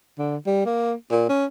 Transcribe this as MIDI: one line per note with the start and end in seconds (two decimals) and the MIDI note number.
0.18 0.37 50
0.46 0.63 55
0.65 0.94 58
1.11 1.28 46
1.29 1.46 61